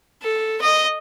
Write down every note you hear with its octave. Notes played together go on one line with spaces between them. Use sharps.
A4
D#5